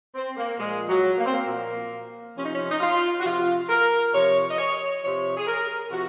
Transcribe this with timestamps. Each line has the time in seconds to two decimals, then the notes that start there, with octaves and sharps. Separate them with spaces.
0.15 C4
0.37 A#3
0.59 A#2 F3 G#3
0.89 F#3
1.18 A#3
1.26 C4
1.33 A#3
1.48 A#2 F3
2.37 C3 F3 C#4
2.44 D#4
2.52 C#4
2.71 D#4
2.81 F4
3.20 F#4
3.25 C3 F3 F4
3.69 A#4
4.14 C3 F3 C#5
4.51 D#5
4.59 C#5
5.02 C3 F3 C#5
5.37 G#4
5.47 A#4
5.91 C3 F3 F#4